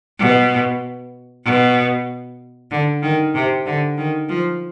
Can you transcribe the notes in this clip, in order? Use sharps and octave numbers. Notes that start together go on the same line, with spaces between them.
B2
B2
D3
D#3
C3
D3
D#3
F3